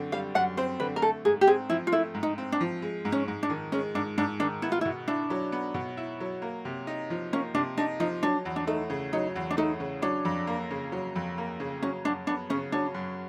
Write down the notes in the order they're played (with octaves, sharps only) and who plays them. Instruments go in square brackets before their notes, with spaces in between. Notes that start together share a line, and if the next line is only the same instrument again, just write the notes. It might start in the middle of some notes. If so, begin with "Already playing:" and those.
Already playing: [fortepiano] F#2 D3 C4
[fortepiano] G3 [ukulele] F5
[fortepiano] F#2 [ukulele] F#5
[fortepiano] C4 [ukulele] C5
[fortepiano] D3 [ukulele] B4
[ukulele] A#4
[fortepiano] A3 [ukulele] A4
[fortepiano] G#2 [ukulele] G#4
[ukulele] G4
[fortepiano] C4 [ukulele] G#4
[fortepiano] F3 [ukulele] E4
[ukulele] F4
[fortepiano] A3 [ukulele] E4
[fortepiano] G#2
[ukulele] D#4
[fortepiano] C4
[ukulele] D4
[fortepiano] F3
G#3
G#2
[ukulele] C#4
[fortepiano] G#2
[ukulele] D4
[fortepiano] D#3
[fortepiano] G#3 [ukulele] C#4
[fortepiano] G#2 [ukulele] D4
[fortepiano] G#2 [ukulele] D4
[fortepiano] D#3 [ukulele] D4
[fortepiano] B3 [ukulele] E4
[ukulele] F4
E4
[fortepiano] B2
[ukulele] D4 [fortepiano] E4
[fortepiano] F#3
B3
B2
E4
F#3
A#3
C3
D#4
F3
[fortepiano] A#3 [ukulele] C#4
[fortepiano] C3 [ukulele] D4
[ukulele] D4 [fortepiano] D#4
[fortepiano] F3 [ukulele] D#4
[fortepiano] F#3 [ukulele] D4
[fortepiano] E2
[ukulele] D4
[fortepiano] A3 [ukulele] D#4
[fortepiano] C#3
[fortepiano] F#3 [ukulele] D#4
[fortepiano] E2
[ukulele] D4
[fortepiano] A3 [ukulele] D#4
[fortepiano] C#3
[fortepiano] F#3 [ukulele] D4
[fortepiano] F2
A#3
C#3
F#3
F2
A#3
C#3
[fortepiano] F#3 [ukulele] C#4
[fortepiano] F#2 [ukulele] D4
[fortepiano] B3 [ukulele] D4
[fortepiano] C#3 [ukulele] C#4
[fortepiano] F#3 [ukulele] D4
[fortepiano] F#2